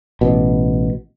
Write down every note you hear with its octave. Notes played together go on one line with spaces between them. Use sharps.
A1 B2